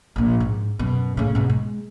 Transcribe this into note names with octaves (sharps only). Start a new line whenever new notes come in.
A#1 A#2
G#2
F#2 B2
A2 C#3
G#2 B2
G#3